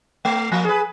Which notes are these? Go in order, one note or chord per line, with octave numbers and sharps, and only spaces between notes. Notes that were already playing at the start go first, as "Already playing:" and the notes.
A3
F3 A#3
G#4 B4